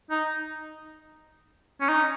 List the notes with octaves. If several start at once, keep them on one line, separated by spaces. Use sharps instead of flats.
D#4
C#4
D#4